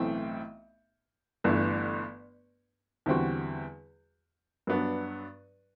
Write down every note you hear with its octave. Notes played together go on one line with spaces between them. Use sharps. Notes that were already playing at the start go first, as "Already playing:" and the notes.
Already playing: B1 A2 E3 A3 C4
G1 G2 E3 A3
E2 D3 G3 C4 F#4
G2 F#3 B3 D4